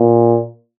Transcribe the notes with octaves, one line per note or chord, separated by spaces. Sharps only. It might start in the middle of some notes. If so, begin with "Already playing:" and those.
Already playing: A#2